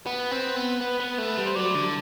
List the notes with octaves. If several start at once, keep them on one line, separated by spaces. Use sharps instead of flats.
B3 B4
C4
B3
B3
B3
A3
G3
C5
F#3 D5
D3